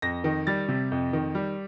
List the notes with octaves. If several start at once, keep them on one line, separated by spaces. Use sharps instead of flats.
F2 A#6
D#3
G3 A6
C3
F2
D#3
G3